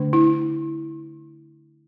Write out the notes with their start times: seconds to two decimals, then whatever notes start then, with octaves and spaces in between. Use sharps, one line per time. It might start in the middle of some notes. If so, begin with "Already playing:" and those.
Already playing: D3 A3 D4
0.13 E4